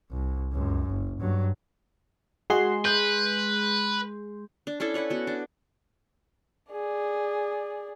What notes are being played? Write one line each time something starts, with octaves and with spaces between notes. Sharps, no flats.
C2
C#2 F#2
F#1
G2 F#3
G#3 F#4 G#4 C6
B4 G6
D4
C#4 D4 E4 A4
E4 B4 C#5 F#5
B3 F#4
D4
G#4 D5